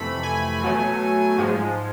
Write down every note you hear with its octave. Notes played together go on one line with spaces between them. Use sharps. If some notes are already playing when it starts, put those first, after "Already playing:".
Already playing: F2 C3 E3 A3 B5
G#5
B2 F#3 A3
G#2 F3 G#3